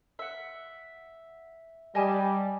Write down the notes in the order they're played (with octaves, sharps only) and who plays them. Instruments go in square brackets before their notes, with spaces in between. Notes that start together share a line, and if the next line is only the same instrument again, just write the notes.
[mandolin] E5 F#5
[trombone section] G3 [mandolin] D#5 G#5 A5